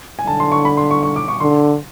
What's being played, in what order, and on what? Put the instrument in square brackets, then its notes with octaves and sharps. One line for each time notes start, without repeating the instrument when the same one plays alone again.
[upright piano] G#5
[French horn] D3 [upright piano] A5
[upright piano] C6
C#6
B5
C6
C#6
C#6
D6
C#6
[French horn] D3 [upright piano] C6